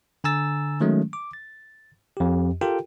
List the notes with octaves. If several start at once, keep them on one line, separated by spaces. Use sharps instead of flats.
D3 G#5 A#5 E6 A6
D#3 F#3 G#3 A3 C#4
D6
A6
F2 G4
F4 G4 A4 A#4 G5